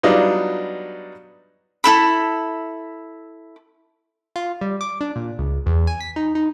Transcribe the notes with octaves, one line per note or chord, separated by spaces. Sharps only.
F#3 G3 B3 D4 D#4 F4
E4 A4 B5
F4
G3
D6
D4
A#2
C#2
E2
G#5
B6
D#4
D#4